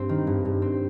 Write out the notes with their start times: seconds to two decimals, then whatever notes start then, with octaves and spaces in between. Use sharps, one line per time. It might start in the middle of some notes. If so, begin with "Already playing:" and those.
Already playing: G2 C4
0.09 D#3
0.27 G2
0.45 G2
0.62 C4